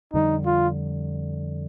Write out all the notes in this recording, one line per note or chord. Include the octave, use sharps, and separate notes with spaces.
F2 D3 G3 D#4
F4